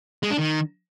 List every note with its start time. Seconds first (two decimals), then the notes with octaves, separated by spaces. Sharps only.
0.23 G#3
0.31 D4
0.38 D#3